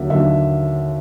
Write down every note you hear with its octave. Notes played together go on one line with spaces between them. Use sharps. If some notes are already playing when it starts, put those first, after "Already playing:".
Already playing: D#2 D3 F#3 E5
D#2 D3 F#3 E5